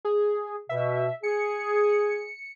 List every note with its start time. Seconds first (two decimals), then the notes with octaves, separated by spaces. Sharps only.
0.05 G#4
0.69 B2 E5
1.23 G#4 C#7